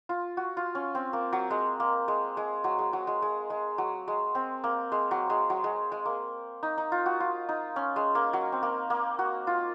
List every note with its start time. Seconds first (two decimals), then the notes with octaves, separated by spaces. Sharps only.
0.09 F4
0.37 F#4
0.57 F4
0.75 C#4
0.95 C4
1.13 A#3
1.33 F#3
1.50 G#3
1.80 A#3
2.08 G#3
2.37 G#3
2.64 F#3
2.79 G#3
2.93 F#3
3.07 G#3
3.22 G#3
3.50 G#3
3.78 F#3
4.08 G#3
4.35 C4
4.64 A#3
4.92 G#3
5.11 F#3
5.30 G#3
5.50 F#3
5.64 G#3
5.92 G#3
6.05 A#3
6.63 D#4
6.78 D#4
6.92 F4
7.06 F#4
7.20 F4
7.49 D#4
7.76 C#4
7.96 G#3
8.15 A#3
8.33 F#3
8.52 C4
8.63 A#3
8.90 A#3
9.19 F#4
9.47 F4